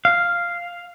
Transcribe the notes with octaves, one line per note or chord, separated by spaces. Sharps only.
F5